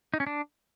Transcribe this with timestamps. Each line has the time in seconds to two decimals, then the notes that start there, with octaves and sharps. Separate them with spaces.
0.14 D#4
0.20 C#4
0.27 D4